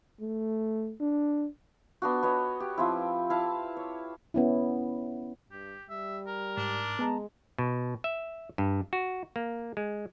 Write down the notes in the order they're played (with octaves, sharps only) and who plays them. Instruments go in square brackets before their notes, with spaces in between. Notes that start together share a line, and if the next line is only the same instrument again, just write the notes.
[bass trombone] A3
D4
[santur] B3 D4 F#4
B3 C#5 D#5
G4
F3 C4 E4
E4 F5 A5
C#5
[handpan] B3 C#4 E4
[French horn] G2 [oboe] G4
[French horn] G3 [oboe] E5
[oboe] A#4
[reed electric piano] G#2 [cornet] D4
[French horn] G#3 [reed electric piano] B3 A5 A#5
[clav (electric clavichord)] B2
E5
G2
F#4
A#3
G#3